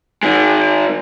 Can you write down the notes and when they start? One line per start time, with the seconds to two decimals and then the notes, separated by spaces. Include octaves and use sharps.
0.23 D#3 G#3